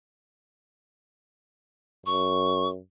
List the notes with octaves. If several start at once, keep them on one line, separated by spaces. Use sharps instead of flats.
F#2 C#6